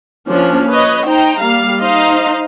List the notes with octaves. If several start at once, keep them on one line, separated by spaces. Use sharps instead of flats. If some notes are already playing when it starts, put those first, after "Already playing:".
F3 A#3 C#4 D4
B4 C#5 D#5
D#4 C5 G5 A#5
G3 A#3 F5
D#4 C5 D#5 F5